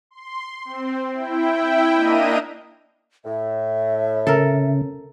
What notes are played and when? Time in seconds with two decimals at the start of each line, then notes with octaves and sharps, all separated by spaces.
0.11 C6
0.65 C4
1.13 E4 G5
1.94 A#3 D4 D#5 E5 A#5 D#7
3.25 A2 E5
4.27 C#3 A4 A#4